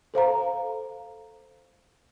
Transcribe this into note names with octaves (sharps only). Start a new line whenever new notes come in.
A4 C5 F5 A#5